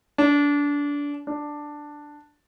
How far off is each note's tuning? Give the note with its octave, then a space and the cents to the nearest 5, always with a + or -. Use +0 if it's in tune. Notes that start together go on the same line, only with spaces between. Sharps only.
D4 -25
D4 +5